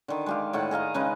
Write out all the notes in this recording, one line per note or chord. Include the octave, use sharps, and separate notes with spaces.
D3 D#3
G#3 G4 F5
A2 D#3 F#5
G#4 D#5 F5 A#5
C#3 G#3 D#4 B4